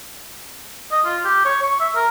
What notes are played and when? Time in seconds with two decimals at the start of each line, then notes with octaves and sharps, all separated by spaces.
0.92 D#5
1.05 F4
1.25 G4
1.45 C#5
1.63 C#6
1.80 E5
1.96 A#4